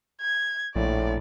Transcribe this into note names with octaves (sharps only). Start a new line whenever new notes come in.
G#6
A#1 A2 D5